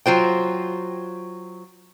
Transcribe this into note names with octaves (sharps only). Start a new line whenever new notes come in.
F#3 F4 C5 G5